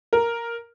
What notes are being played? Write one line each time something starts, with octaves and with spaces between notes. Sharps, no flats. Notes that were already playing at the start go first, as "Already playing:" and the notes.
A#4